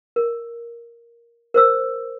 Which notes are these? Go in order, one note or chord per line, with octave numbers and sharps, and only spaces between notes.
A#4
A#4 C5 E6